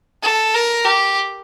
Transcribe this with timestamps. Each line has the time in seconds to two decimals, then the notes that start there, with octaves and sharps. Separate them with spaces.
0.23 A4
0.55 A#4
0.85 G4